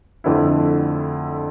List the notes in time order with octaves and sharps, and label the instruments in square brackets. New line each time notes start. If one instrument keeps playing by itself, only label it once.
[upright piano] F2 D3 A3 E4